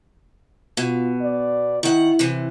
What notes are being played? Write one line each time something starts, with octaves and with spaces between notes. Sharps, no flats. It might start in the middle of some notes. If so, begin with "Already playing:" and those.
B2 F4
D5
D#3 E4 F#5
C3 E3